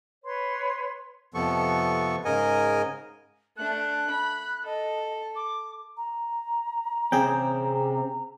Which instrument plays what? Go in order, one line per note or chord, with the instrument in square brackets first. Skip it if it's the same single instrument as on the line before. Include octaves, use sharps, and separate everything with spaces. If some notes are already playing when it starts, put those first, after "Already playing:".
[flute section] B4 C#5 C6
[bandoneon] F2 C3 F3 B3 A4 C#6
G#2 C#3 A#4 D#5 G#5
[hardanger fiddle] A3 D4 [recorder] F#6
[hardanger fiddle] B5
[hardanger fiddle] A4 [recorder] D#5
[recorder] D6
[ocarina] A#5
[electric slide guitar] C3 C4 C#4 [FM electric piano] G#4 G5